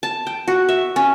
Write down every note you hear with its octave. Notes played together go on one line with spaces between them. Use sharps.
A5
G5
F#4
E5
C#4